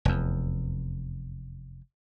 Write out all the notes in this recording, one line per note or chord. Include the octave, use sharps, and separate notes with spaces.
F1 E2